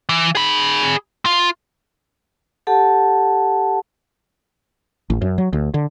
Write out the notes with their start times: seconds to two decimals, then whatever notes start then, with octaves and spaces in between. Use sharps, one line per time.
0.09 E3
0.35 G#4 B5
1.26 F4
2.67 G4 A4 F#5 A5
5.10 A1
5.22 F#2
5.38 F#3
5.53 D2
5.74 D3